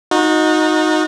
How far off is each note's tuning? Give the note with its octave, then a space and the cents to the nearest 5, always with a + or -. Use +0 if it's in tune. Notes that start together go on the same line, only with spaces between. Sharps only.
D#4 +0 F#4 -30